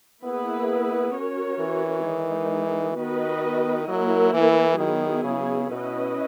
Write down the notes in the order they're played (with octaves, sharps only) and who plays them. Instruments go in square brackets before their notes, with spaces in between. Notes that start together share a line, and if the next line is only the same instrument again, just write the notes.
[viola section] A#3 E4 G#4 B4 [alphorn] B3
[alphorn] B3
[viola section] C#4 F#4 A#4 C#5
[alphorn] E3
[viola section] D#3 G#3 D#4
[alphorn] D#3 [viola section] B3 F#4 B4 D#5
[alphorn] F#3 [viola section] A#3 E4 A#4
[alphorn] E3
[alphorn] D#3 [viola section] F#3 B3 E4 G#4
[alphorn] C#3
[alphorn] B2 [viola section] C#4 E4 B4 D#5